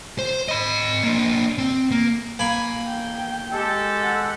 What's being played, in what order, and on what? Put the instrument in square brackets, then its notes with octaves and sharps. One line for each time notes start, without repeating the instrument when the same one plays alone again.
[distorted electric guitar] C5
D#5 B5
A#3 D4
C4
A#3
[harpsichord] A#3 G#5 B5
[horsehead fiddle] G5
[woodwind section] G#3 G4 A4
[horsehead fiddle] F#5